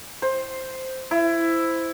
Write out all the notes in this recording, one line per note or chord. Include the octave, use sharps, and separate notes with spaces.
C5
E4